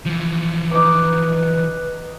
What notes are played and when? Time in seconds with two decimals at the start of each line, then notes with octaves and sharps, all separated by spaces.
0.06 E3 F3
0.71 D#4 B4 D6